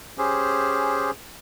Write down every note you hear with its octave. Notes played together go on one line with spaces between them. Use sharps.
C#4 G4 G#4 C5